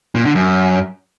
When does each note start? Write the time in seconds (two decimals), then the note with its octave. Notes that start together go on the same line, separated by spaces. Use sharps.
0.15 A#2
0.25 D3
0.35 F#2